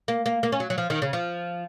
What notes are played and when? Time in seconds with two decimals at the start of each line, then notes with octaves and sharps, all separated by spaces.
0.08 A#3
0.26 A#3
0.43 A#3
0.52 C#4
0.60 F#3
0.70 F#3
0.78 F3
0.90 D#3
1.02 C#3
1.13 F3